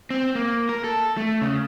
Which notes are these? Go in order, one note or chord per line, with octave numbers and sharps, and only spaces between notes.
C4
A#3
A#4
A4
A3
C#3